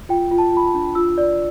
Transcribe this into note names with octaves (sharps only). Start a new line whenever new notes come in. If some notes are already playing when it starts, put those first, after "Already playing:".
F4 G5
F4
A5
F4 B5
A5
D4
F4 E6
D5